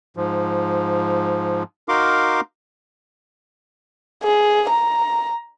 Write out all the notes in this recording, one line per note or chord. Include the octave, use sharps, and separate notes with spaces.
G#2 F3
D#4 F#4 A#4 F5 C6 D6
G#4
A#5